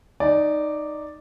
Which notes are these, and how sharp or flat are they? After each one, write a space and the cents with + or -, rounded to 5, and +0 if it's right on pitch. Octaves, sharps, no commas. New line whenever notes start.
D#4 -10 D5 +0 G#5 +35